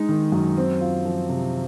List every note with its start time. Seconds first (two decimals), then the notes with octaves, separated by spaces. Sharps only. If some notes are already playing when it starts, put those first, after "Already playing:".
Already playing: G#3 D#4
0.09 D#3
0.32 F#2
0.57 C4
0.81 F4
1.05 F3
1.29 C3